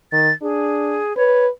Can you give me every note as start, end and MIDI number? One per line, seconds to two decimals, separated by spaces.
0.12 0.30 51
0.12 0.32 93
0.42 1.01 62
0.42 1.16 68
1.17 1.48 71
1.17 1.45 73